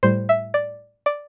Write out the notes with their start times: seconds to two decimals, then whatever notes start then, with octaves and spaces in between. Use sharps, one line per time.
0.03 A2 G3 C5
0.29 E5
0.54 D5
1.06 D5